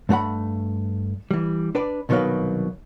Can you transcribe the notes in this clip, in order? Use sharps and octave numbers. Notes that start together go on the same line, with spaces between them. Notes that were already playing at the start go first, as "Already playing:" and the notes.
G2 A3 G#4 F#5 B5
E3 G3
D4 B4 D5
C2 B2 D#3 F#3 B4 F5